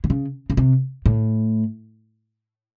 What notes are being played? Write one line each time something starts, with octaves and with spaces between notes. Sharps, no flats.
D3
C#3
C#3
C3
A2